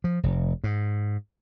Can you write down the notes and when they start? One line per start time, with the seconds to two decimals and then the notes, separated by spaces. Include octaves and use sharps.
0.04 F3
0.23 F1
0.64 G#2